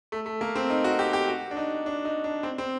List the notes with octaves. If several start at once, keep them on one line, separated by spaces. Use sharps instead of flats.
A3
A3
A#3
C4
D#4
F#4
G4
G4
F#4
D4
D#4
D4
D#4
D4
C4
C4